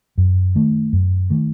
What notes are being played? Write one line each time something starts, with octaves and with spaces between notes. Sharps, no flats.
F#2
D#3 A3
F#2
D#3 A3